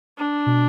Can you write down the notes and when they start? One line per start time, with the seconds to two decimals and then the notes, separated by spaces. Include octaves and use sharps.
0.18 D4
0.46 B2